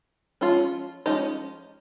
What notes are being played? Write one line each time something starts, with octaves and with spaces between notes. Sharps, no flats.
F3 G#3 C#4 F4
F3 G#3 C#4 D#4 G4